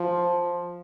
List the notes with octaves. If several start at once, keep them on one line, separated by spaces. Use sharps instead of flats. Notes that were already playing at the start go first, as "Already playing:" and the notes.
Already playing: F3